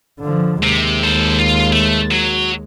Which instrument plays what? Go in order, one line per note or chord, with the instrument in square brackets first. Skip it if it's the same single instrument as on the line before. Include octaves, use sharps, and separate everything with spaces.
[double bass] D3 F3
[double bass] D#2 G#3 [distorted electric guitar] C3
[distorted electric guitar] A4 C5
F4
A3
F#3